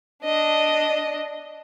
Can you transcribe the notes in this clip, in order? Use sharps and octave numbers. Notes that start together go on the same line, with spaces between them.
D4 D#5